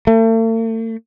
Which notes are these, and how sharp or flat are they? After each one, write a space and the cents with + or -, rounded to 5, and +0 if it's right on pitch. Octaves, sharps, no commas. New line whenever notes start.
A3 +40